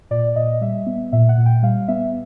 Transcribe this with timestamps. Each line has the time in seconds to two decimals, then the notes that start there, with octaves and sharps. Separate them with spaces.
0.11 A#2 D5
0.36 A#2 D#5
0.61 G3 E5
0.87 B3
1.13 A#2 E5
1.29 F#5
1.38 A#2
1.46 G5
1.63 G3 F5
1.88 B3 E5